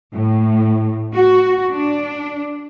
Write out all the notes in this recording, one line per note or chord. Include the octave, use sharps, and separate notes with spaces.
A2
F#4
D4